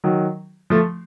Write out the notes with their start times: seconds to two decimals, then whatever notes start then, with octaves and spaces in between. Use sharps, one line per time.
0.04 D#3 F#3
0.70 F3 A3